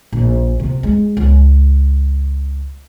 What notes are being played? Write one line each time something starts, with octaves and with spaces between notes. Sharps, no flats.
A#1
C3
G#3
C#2